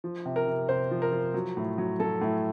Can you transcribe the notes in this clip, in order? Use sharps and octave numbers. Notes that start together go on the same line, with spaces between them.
F3
C3
A#4
C3
C3 C5
F3
A#4
F3
F#3
A2
F#3
F#3 A4
A2